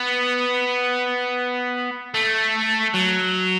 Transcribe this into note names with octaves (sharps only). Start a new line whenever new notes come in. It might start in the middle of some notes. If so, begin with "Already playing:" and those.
Already playing: B3
A3
F#3